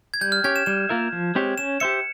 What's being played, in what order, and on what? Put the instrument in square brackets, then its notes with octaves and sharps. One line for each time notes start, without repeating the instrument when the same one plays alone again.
[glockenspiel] G#6
[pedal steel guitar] G3 [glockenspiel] G6
[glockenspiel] F6
[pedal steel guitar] C#4 G4 C#5 [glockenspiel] G#6
[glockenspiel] E7
[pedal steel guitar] G3 [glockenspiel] E7
[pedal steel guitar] A#3 F4 A#4 E5
F3
G#3 C4 G4 C#5
[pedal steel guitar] C#4 [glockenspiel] E7
[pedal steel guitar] G4 C5 E5 [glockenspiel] C#7